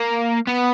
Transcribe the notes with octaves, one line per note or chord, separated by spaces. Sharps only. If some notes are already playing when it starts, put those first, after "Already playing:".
Already playing: A#3
B3